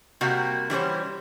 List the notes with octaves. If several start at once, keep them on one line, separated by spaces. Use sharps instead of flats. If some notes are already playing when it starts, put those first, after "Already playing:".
C3 G3 A#3 F#4
E3 G3 C#4 C5